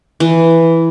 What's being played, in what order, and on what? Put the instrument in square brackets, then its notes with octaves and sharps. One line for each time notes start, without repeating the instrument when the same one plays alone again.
[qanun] E3